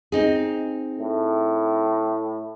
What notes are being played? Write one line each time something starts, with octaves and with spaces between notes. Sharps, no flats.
C4 D#4 G#4
A2